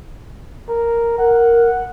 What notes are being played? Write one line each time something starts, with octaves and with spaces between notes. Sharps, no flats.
A#4
A#4 F#5